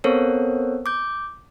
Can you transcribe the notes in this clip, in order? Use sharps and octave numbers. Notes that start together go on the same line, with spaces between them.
B3 C4 A4 A#4 C5 C#5
D6 G6